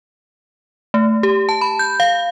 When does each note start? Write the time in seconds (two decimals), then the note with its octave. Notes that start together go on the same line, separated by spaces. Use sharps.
0.94 A3
1.23 G4
1.49 A5
1.61 B5
1.79 G6
2.00 F5